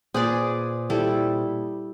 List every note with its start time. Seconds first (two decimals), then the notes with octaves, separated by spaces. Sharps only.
0.14 A#2 G#4 B4 C5 D5 D#6
0.90 G3 E4 A4